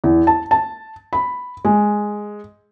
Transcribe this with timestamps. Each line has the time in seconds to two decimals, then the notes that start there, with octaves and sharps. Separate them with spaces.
0.04 E2
0.27 A5
0.51 A5
1.13 B5
1.65 G#3